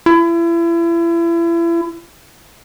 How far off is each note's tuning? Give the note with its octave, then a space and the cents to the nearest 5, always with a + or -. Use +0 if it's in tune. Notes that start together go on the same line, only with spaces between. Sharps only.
E4 +35